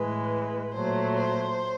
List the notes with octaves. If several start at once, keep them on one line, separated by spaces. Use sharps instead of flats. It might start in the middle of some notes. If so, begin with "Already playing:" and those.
Already playing: A2 E3 G#3 B4
A#2 F#3 A3 C5
C5